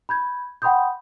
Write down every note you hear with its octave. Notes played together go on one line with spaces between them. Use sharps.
B5 G6 G#6
F#5 G5 B5 C6 D#6 G6